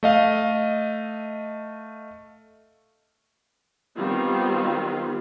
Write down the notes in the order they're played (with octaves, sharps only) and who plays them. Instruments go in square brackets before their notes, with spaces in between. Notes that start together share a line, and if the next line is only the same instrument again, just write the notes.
[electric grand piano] A3 D#5 F5
[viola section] D#3 G3 B3 C4 F4